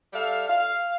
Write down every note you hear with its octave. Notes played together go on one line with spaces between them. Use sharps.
G3 A4 E5 F5
F5